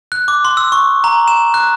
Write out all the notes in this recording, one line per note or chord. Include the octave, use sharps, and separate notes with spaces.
F#6
D6
C6
E6
C#6
A#5
E7
F#6